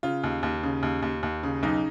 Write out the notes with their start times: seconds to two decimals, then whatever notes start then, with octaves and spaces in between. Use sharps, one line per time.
0.03 C#3 F4
0.24 D#2
0.43 D#2
0.63 C#3
0.83 D#2
1.03 D#2
1.23 D#2
1.43 C#3
1.63 B1 D#4